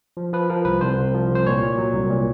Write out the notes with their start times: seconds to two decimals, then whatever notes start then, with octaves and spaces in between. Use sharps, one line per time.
0.17 F3
0.33 F3 B4
0.50 F3 A#4
0.65 C2 B4
0.81 C2 C5
0.98 C2
1.14 F3
1.30 C2
1.35 C5
1.47 A#2 C#5
1.63 A#2
1.78 F#3
1.94 C2
2.10 A#2